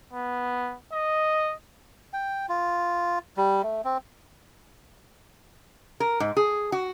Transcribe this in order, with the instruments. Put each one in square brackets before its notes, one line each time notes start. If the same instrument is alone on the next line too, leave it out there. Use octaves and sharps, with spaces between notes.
[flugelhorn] B3
D#5
[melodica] G5
F4
G3
A3
C4
[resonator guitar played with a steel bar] A#4
G#2
G#4
F#4